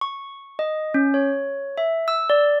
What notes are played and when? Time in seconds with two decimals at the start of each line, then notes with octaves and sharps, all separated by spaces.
0.01 C#6
0.59 D#5
0.94 C#4
1.14 C#5
1.78 E5
2.08 E6
2.30 D5